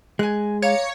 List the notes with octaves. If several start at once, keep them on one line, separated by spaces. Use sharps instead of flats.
G#3 G#5 F#6
C#5 F5 A#5 D6